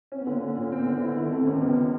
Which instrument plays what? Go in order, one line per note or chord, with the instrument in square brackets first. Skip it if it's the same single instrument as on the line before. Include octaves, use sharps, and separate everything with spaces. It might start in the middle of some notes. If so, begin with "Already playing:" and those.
[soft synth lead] C4 [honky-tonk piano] C#4
[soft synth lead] B3
[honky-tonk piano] D3
[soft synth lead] A#3
[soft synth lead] A#3 [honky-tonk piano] C#4
[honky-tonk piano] A#2
[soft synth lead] B3 [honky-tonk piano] C4
[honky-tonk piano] D3
E4
D#3
[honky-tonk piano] A3 [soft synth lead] C4
[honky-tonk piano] D#2 [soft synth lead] C#4
[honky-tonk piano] C#2 [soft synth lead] B3